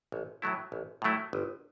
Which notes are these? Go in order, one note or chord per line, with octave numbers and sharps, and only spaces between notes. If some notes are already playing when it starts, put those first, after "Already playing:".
A1
A2 F#3 A3 E4
A1
A2 F#3 A3 E4
G1